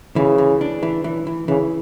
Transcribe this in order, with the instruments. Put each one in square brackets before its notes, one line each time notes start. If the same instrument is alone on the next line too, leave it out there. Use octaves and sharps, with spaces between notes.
[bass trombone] C#3 [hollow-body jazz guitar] E3
[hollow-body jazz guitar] E3
D4
E3
E3
E3
[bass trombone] C#3 [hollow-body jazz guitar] E3